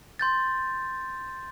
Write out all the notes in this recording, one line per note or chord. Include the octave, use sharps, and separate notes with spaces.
C6 G6 A6